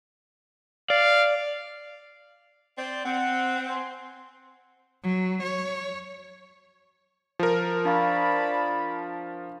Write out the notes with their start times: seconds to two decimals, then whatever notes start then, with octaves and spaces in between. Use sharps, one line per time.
0.90 D5 F5
2.77 C4 C5 D5
3.05 C4 F#5
3.69 G#5 C6
5.03 F#3
5.44 C#5
7.39 F3 A#4
7.85 D4 D5 F5 A5 B5 C#6